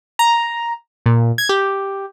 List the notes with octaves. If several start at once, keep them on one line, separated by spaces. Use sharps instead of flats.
A#5
A#2
G#6
G4